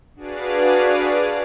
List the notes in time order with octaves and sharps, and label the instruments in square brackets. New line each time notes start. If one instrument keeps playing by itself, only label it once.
[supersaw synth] D4 F#4 G#4 B4 D5 F5